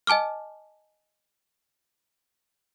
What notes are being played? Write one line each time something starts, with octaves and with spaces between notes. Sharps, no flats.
D#5 G#5 A5 D6 F6